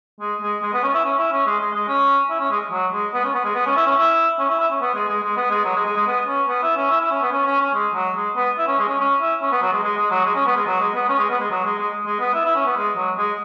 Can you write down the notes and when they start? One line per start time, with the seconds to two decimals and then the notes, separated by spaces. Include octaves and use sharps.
0.21 G#3
0.42 G#3
0.63 G#3
0.74 B3
0.83 C#4
0.94 E4
1.04 C#4
1.18 E4
1.32 C#4
1.46 G#3
1.60 G#3
1.74 G#3
1.88 C#4
2.30 E4
2.40 C#4
2.51 G#3
2.72 F#3
2.93 G#3
3.14 B3
3.24 C#4
3.34 B3
3.45 G#3
3.55 B3
3.66 C#4
3.76 E4
3.87 C#4
3.98 E4
4.39 C#4
4.50 E4
4.60 E4
4.70 C#4
4.81 B3
4.95 G#3
5.09 G#3
5.23 G#3
5.37 B3
5.50 G#3
5.65 F#3
5.76 G#3
5.86 G#3
5.96 G#3
6.07 B3
6.27 C#4
6.48 B3
6.63 E4
6.76 C#4
6.90 E4
7.01 E4
7.11 C#4
7.22 B3
7.32 C#4
7.46 C#4
7.60 C#4
7.74 G#3
7.94 F#3
8.16 G#3
8.36 B3
8.58 E4
8.67 C#4
8.79 G#3
8.89 C#4
9.00 C#4
9.20 E4
9.42 C#4
9.52 B3
9.62 F#3
9.73 G#3
9.83 G#3
9.97 G#3
10.11 F#3
10.25 G#3
10.36 C#4
10.46 B3
10.56 G#3
10.67 F#3
10.80 G#3
10.94 B3
11.09 C#4
11.19 G#3
11.30 B3
11.40 G#3
11.51 F#3
11.65 G#3
11.78 G#3
12.06 G#3
12.20 B3
12.34 E4
12.45 E4
12.55 C#4
12.66 B3
12.77 G#3
12.97 F#3
13.18 G#3